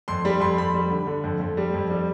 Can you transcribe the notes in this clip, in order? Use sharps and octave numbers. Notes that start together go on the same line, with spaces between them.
F2 C6
G3 B5
F2 C6
F2 B5
G3
D3
D3
F2
F2
G3
F2
G3